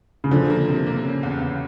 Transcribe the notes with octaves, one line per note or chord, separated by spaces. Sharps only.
C#3
D3 F3
A#3
C3
A#3
C#3
E2
E2